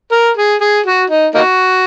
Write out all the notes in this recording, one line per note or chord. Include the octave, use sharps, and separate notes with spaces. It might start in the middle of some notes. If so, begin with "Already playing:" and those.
A#4
G#4
G#4
F#4
D#4
A#3 D#4 F#4